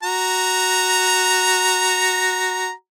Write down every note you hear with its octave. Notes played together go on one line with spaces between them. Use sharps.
F#4 A#5